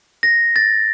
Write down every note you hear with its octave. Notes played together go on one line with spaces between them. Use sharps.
A#6
A6